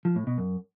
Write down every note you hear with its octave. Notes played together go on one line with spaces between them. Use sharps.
F3
A2
B2
F#2